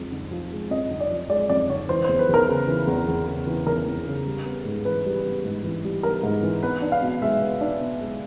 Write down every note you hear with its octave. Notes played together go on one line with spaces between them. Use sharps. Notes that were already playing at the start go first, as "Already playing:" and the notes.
Already playing: F2 F3 G#3
D3
F3
G#3
F2 D#5
D3
D5
F3
G#3 D5
F2 D5
D3 C#5
E3 C5
E2 C5
B4
E2 A#4
C#3
E3
E2
E2
C#3
E3
E2 A#4
E2
C#3
G3
B3
G#2
E3 B4
G3
B3
G#2
E3
G3
B3 A#4
G#2
E3
B3 B4
D4
F5
B2
G#3 E5
B3
D4
B2
G#3